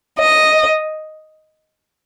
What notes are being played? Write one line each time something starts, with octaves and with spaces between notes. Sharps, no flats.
D#5